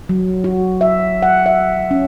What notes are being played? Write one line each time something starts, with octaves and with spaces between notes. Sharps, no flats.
F#3
F#4
E5
F#5
E5
C#4